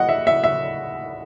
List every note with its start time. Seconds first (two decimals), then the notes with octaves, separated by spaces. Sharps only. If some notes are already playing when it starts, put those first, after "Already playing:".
Already playing: D#5 F#5
0.09 E5
0.27 E5
0.44 E5